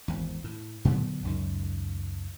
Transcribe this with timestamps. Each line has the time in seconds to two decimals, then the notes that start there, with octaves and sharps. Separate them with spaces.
0.08 G#1 E2
0.44 A2
0.85 A#2 D3 F#3 B3
1.23 C#2 F#2 D#3